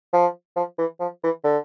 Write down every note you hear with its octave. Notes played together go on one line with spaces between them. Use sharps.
F3
F3
E3
F3
E3
D3